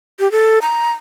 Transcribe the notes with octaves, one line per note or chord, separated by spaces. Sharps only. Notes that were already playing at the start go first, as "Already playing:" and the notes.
G4
A4
A#5